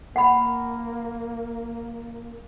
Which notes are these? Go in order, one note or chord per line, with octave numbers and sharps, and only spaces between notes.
A#3 F#5 B5